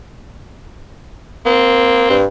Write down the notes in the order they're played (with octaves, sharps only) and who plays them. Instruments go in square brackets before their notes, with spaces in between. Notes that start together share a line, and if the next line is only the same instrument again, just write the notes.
[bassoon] A#3 [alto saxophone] C4
[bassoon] G2